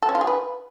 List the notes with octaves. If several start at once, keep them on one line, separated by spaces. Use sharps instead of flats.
A4
C#4
F4
G#4
B4